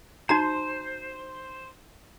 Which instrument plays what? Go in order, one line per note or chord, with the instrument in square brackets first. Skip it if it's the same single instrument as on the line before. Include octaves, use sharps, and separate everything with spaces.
[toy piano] D#4 F#4 A#5 [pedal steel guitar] C5